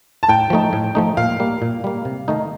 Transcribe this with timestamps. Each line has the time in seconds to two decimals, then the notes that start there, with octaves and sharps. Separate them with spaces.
0.23 A5
0.29 A2 G5
0.50 F3 A3 D#4
0.73 A2
0.95 F3 A3 D#4
1.17 A#2 F5
1.40 G3 A#3
1.62 A#2
1.84 G3 A#3
2.05 C3
2.28 D#3 A3 D#4